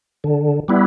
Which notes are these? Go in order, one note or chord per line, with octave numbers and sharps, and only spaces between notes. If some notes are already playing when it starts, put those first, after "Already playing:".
D3
G3 B3 E4